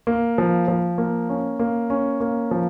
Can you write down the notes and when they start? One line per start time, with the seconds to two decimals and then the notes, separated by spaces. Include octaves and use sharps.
0.07 A#3
0.38 F3
0.68 F3
0.98 A#3
1.29 C#4
1.59 A#3
1.90 C#4
2.20 A#3
2.51 F3